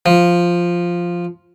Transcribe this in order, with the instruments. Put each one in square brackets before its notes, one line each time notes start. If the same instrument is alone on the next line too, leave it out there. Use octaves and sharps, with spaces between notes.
[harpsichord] F3